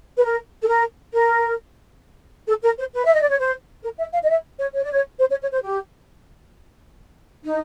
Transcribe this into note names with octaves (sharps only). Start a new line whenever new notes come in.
B4
A#4
A4
A#4
A#4
A4
A#4
C5
B4
E5
D#5
D5
C#5
C5
A#4
E5
F5
D#5
E5
C#5
C#5
D5
C#5
C5
C#5
C#5
C5
G4
D#4